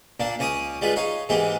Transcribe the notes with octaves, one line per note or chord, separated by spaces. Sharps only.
A#2 A#3 D4
C#2 C#4 D5 C#6 D#6
G3 G#3 F4 B4
D#4 C#5 F5
G#2 E3 G#3 A#3 G4